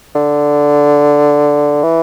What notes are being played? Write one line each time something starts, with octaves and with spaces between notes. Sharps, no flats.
D3
E3